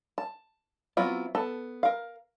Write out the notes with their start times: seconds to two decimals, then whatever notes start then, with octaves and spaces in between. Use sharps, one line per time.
0.18 A5
0.97 F#3 B3 C4 E4 F4
1.35 B3 A4 A5
1.83 A#4 F5